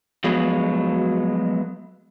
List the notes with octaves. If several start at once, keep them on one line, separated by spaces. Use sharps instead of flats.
F3 F#3 G#3 A3 B3 F#4